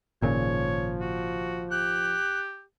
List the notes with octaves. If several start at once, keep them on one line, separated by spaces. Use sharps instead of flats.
G#1 A#2 C#3 F3 C#5
F#4
G4 F#6